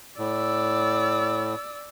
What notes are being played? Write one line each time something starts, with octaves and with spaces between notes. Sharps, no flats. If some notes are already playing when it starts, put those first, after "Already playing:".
A2 D5 E6